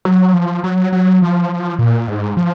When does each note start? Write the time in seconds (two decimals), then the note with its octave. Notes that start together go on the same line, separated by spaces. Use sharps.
0.05 F#3
0.34 F3
0.64 F#3
0.92 F#3
1.22 F3
1.79 A#2
2.08 G#2
2.37 F3